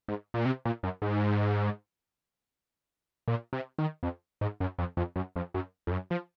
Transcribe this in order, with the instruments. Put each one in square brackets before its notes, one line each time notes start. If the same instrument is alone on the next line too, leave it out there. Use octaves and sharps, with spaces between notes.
[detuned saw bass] G#2
A#2
C3
A#2
F#2
G#2
A#2
C3
D#3
F2
G#2
F#2
F2
F2
F#2
F2
F#2
F2
F#2
F3